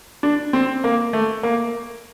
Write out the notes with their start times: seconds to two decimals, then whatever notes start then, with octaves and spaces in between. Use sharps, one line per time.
0.23 D4
0.53 C4
0.84 A#3
1.13 A3
1.43 A#3